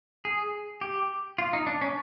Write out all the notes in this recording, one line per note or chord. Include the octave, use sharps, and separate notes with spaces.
G#4
G4
F4
D#4
D4
C#4